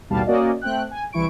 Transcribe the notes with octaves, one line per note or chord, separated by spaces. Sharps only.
A1 D#2 B2 G3 F5 A5
A#3 C#4 F#4 D5 D#5
A3 C4 G5 F#6
G#5
C2 E3 E4 C#6 D7